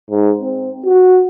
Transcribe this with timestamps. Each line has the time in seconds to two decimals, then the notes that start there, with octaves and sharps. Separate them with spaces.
0.10 G#2
0.41 C4
0.85 F#4